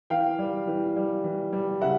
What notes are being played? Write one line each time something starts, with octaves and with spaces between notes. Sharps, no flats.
E3 F5 G5
G3
E3
G3
E3
G3
C#3 E5 F#5